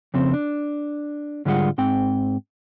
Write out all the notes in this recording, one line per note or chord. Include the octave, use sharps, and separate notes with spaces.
F2 C#3 C4
D4
G#2 D3 G3 F4 G#4 F#5
G#2 C4 G5